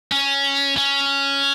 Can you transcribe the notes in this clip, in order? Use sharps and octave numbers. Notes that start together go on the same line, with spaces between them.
C#4
C#4